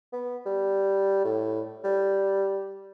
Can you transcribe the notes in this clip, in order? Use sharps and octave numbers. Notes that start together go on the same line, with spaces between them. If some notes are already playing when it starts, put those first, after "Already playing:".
B3
G3
A2
G3